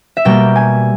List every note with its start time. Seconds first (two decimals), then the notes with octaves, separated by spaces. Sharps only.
0.17 E5
0.25 B2 G3 A#3 G5
0.56 G#5